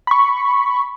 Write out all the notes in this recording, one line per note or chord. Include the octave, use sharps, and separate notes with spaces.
B5 C#6